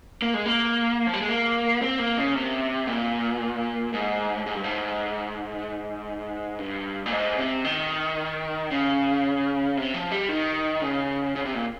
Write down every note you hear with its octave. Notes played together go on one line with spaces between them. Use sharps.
A#3
G#3
A#3
F3
G3
G#3
A#3
C4
A#3
C#3
C3
A#2
G#2
G#2
G2
G#2
G2
A#2
G#2
C3
D#3
C#3
C3
F3
G3
D#3
C#3
C#3
C3
A#2